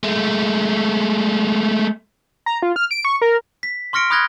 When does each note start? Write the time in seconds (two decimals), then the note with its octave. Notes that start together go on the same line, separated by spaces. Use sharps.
0.03 G#3 A3
2.46 A#5
2.62 F4
2.76 F6
2.91 D7
3.05 C#6
3.22 A#4
3.63 B6
3.93 C6 C#6 F6 A#6 C#7 D7
4.10 B5 D#6 F#6 G#6 A#6 G7